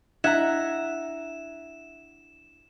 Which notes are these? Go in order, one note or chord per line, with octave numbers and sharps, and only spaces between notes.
D4 E4 E5 F#5 A#5 G#6 E7